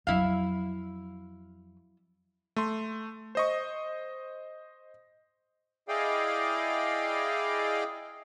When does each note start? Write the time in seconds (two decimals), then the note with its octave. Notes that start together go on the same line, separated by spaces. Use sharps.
0.07 F2 F#3 E4 F5
2.56 A3 C6
3.35 C5 D#5 C#6
5.88 E4 G#4 D5 D#5 F5 G5